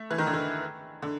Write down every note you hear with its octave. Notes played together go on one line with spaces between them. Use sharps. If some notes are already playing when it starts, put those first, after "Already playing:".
Already playing: A3
E3
D#3
D3
D#3
D3